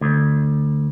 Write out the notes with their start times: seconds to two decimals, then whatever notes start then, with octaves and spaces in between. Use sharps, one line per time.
0.01 D2